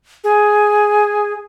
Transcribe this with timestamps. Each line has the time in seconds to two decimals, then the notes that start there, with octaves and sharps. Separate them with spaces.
0.24 G#4